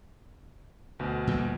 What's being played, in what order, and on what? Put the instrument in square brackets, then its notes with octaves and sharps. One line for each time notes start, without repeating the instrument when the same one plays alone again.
[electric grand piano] D2 B2
[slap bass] A#2 E3 G3